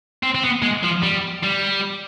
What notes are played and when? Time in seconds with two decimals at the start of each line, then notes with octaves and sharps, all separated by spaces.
0.23 C4
0.35 C4
0.43 B3
0.63 G#3
0.83 F3
1.03 G3
1.43 G3